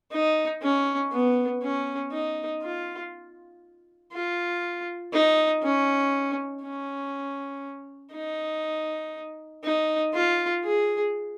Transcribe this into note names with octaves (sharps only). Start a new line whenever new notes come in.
D#4
C#4
B3
C#4
D#4
F4
F4
D#4
C#4
C#4
D#4
D#4
F4
G#4